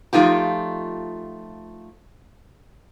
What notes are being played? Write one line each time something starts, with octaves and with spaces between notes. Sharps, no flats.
F3 A3 D#4 F4 G4